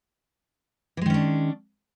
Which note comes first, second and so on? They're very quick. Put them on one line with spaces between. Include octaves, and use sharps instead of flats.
E3 G#3 D#3 C#4 D4